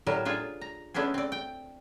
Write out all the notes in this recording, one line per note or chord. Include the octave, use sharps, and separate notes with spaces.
A2 F#3 G3 A#4
D4 F4 G#4
A#5
G#3 A3 B3 C#4 D4 G#4
C4 D5
G5